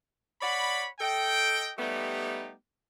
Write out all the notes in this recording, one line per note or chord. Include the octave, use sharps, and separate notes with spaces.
C#5 D5 F#5 B5
A4 D#5 G5
G3 A3 B3 D#4 G4